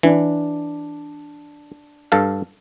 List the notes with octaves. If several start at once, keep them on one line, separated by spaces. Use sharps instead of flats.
E3 D4
G2 A4 F5